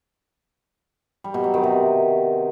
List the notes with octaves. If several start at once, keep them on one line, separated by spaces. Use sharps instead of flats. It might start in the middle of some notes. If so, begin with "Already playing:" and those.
G3
B2
F#3
D#3
C3